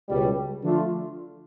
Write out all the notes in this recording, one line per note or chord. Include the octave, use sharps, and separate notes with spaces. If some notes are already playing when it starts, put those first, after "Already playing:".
C#2 B2 G3
D3 F3 A3 D4 F4